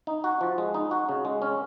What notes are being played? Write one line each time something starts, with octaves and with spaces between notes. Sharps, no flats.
D#4
F#4
F3
G#3
D#4
F#4
C#3
G#3
C#4